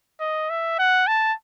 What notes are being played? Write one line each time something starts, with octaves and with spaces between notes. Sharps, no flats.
D#5
E5
F#5
A5